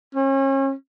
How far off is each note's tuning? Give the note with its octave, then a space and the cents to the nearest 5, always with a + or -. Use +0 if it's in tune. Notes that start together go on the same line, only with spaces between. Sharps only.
C#4 -35